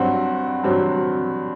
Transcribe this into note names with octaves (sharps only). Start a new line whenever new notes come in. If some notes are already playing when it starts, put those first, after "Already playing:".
Already playing: G2 F#3 C4 F#4
G2 F#3 C4